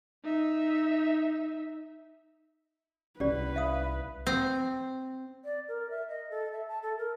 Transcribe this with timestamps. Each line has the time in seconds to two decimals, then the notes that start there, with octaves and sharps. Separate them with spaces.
0.24 D#4 E5
3.20 C2 C#4 G4 B4 D5
3.56 E5 F5 D#6
4.27 C4
5.44 D5
5.68 A#4
5.90 E5
6.09 D#5
6.31 A4
6.52 E5
6.68 A5
6.83 A4
6.99 A#4